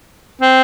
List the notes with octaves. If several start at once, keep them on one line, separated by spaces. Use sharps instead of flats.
C4